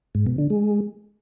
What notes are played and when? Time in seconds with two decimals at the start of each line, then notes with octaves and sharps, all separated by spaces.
0.15 G#2
0.27 B2
0.38 D3
0.50 G#3